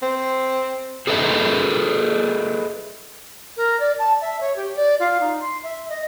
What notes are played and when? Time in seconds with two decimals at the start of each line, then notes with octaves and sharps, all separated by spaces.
0.02 C4
1.07 G#4 A4 B4 D#5 E5
3.57 A#4
3.79 D5
3.99 A5
4.21 E5
4.41 C#5
4.56 G4
4.76 D5
4.99 F4
5.20 D#4
5.40 C6
5.63 E5
5.89 D#5